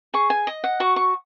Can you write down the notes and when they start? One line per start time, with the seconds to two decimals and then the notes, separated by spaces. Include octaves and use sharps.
0.14 G#4 C#6
0.30 G#5
0.47 D#5
0.64 F#5
0.80 F#4 C#6
0.96 C#6